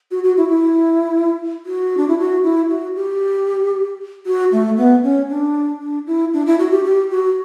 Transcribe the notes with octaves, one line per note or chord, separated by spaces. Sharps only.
F#4
F#4
E4
E4
F#4
D4
E4
F#4
E4
F#4
G4
F#4
A3
B3
C#4
D4
D4
E4
D4
E4
F#4
G4
G4
F#4